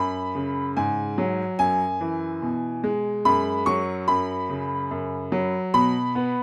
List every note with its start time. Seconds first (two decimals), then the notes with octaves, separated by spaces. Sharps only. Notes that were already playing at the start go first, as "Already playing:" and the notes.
Already playing: F#2 B5
0.35 C#3
0.77 G#2 G#5
1.18 F#3
1.59 F#2 G#5
2.01 E3
2.42 B2
2.84 G#3
3.25 F#2 B5
3.66 F#3 C#6
4.08 F#2 B5
4.50 C#3
4.91 F#2
5.32 F#3
5.74 B2 B5
6.15 B3